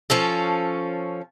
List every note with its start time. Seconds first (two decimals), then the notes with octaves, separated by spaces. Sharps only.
0.10 F3 C#4 A4